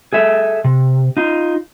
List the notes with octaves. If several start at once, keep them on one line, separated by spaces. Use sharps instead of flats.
G#4 A4 E5
C3
D#4 F4